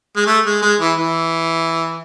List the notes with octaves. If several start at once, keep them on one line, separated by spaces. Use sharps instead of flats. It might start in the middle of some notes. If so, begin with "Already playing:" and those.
G#3
A3
G#3
G#3
E3
E3